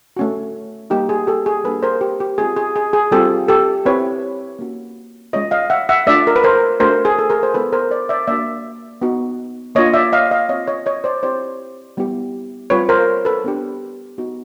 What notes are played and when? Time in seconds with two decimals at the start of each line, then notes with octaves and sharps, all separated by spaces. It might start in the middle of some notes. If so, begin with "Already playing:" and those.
0.17 A3 C#4 F#4
0.90 G3 A#3 D#4 G4
1.09 G#4
1.27 G4 A4
1.46 G#4
1.64 G3 A#3 D4 G4 A4 B4
1.83 A#4 C5
2.01 G4
2.20 G4
2.38 G#3 C4 F4 G#4
2.57 G#4
2.76 G#4
2.93 G#4
3.11 G3 C4 F4 G4 A4
3.49 G4 A4
3.85 C4 E4 G4 B4 C#5
4.59 A#3 C#4 F#4
5.33 G#3 C#4 F4 C#5 D#5
5.51 D#5 F5
5.70 E5 F#5
5.89 E5 F#5
6.06 A3 D4 F4 D5 E5
6.27 A#4
6.36 B4
6.44 A#4 C5
6.80 A3 D4 F#4 A#4 C5
7.05 G#4
7.19 A4
7.30 G#4 A#4
7.43 C5
7.54 G#3 B3 E4 A4 B4
7.72 A#4 C5
7.91 C5 D5
8.09 D5 E5
8.27 A#3 D4 F#4 D5 E5
9.02 B3 D#4 F#4
9.75 A#3 D4 F4 C#5 D#5
9.94 D5 E5
10.13 D#5 F5
10.31 D#5 F5
10.49 C4 F4 C#5 D#5
10.68 C#5 D#5
10.86 C#5 D#5
11.04 C5 D5
11.23 C4 E4 G4 C5 D5
11.97 G3 B3 E4 G4
12.70 G3 C4 F4 B4 C#5
12.89 A#4 C5
13.25 A4 B4
13.44 B3 D4 G4
14.18 B3 D#4 F#4